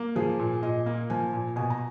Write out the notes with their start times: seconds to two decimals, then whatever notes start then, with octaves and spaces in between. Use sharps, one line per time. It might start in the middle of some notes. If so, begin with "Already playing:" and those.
Already playing: A#3
0.16 F3 G#4
0.39 A#2
0.62 A#2 D#5
0.86 A#3
1.10 F3 G#5
1.33 A#2
1.56 B2 G#5
1.70 A#5